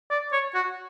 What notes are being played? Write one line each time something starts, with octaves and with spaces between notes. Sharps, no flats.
D5
C#5
F#4